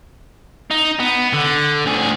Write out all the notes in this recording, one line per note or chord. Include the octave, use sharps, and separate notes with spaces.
D#4
B3
D3
D2 G#4